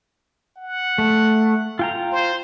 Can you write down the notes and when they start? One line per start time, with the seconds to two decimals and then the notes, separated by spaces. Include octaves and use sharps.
0.57 F#5
0.98 A3
1.79 F4 G5 A#5
2.12 C5